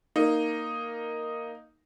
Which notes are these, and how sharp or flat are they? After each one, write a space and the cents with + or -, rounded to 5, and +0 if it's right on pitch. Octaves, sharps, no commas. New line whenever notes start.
A#3 +0 D#4 +0